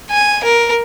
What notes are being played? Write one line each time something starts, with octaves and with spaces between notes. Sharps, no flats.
G#5
A#4